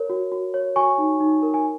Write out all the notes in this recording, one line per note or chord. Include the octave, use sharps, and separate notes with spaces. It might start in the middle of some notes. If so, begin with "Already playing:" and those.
Already playing: A#4 C#5
F#4
F#4
C#5
F#4 G#5 C#6
D#4
D#4
A#4
G#5